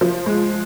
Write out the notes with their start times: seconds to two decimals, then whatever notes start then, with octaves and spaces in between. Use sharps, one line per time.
0.01 F3
0.26 G#3